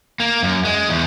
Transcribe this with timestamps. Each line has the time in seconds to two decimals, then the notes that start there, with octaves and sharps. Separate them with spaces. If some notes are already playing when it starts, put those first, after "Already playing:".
0.20 A#3
0.42 F#2
0.65 G#3
0.89 E2